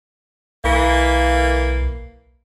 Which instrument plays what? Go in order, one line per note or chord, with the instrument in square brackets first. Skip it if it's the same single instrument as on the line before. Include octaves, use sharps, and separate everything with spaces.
[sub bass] B1 [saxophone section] E3 A#3